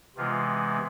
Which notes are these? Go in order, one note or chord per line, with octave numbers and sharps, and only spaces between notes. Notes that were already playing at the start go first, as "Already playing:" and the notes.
C3 E3 G#3 B3 F4